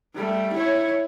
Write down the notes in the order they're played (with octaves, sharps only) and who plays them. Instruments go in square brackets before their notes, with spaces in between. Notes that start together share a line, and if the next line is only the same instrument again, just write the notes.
[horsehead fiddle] G3 A3
E4 C#5